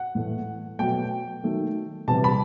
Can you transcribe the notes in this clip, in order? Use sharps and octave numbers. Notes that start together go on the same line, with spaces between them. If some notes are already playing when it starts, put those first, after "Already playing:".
Already playing: F#5
A2 E3 A3
B2 F#3 A3 G5
D#3 F#3 A3
C3 E3 G3 A5
B5